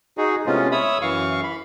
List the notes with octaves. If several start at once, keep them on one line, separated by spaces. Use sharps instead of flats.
D#4 F#4 G#4
A2 C3 G#3 B3 C#4 F4
C#5 E5 B5 D#6 E6
F#2 E3 F5 C#6
B5